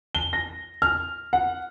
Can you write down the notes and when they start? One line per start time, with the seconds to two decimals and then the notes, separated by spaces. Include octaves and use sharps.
0.15 G7
0.33 A#6
0.82 F6
1.33 F#5